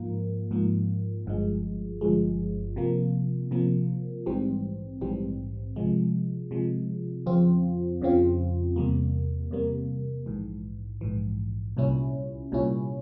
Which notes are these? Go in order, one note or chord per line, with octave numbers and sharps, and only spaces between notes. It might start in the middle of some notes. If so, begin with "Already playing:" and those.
Already playing: G#2 F3 A#3
G#2 F3 A#3
G1 G2 F3 G#3
G1 G2 F3 G#3
C3 F3 A#3
C3 F3 A#3
A#1 G#2 E3 G3 C4
A#1 G#2 E3 G3 C4
C3 F3 G#3
C3 F3 G#3
F2 C#3 F3 C4 F4
F2 C#3 F3 C4 F4
E2 C3 G3 A#3
E2 C3 G3 A#3
A#1 G#2 E3
A#1 G#2 E3
C2 A#2 G3 C#4 E4
C2 A#2 G3 C#4 E4